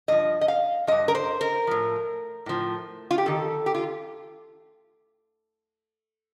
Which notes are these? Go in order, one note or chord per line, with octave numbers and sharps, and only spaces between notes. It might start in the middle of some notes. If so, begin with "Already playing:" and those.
G2 F3 D#5
D#5
F5
G2 F3 D#5
A#4
C5
A#4
A2 F3
A2 F3
F4
G4
F2 D#3 A4
G4
F4